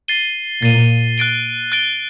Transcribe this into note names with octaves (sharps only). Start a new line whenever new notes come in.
A6 C7 D#7 G7
A#2 A6 C7 D#7 G7
F#6 A6 D7 G7
F#6 A6 D7 G7